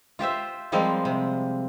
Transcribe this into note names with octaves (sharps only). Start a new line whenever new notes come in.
F4 G4 C5 E5
F3 G3 G#3 A#3 C4
C3